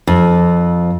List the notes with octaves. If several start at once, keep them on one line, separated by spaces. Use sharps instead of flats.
F2